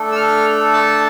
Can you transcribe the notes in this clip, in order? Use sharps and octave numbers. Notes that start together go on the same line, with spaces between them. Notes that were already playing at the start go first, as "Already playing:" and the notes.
Already playing: A3 D4 A4
E6
F6
A5